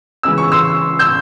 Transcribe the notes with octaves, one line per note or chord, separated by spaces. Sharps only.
C#3 E3 G#3 C#4 E6
C#6
C6 E6
E6 G6